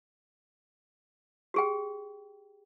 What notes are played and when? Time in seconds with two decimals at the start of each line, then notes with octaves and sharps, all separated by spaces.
1.54 G4 G#4 G5